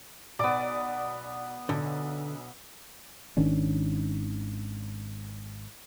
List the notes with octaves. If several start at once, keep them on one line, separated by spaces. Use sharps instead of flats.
B1 B3 D5 D6
B1 D3
G#1 D#3 C#4 D4